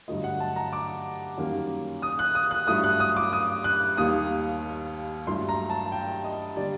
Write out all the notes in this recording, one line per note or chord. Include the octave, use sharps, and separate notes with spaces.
G2 D3 F#3 A3 D#5
F#5
A5
A#5
D6
F#2 D#3 G3 A#3
D#6
F#6
D#6
F#6
G2 F#3 A3 D#6
F#6
D#6
D6
D#6
F#6
D#2 D#3 G3 A#3 D#6
G2 F#3 A3 C6
A#5
A5
G5
D#5
D3 G3 A#3 D5